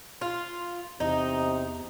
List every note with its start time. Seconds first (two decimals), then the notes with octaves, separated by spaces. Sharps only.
0.21 F4
1.00 E2 C3 D#4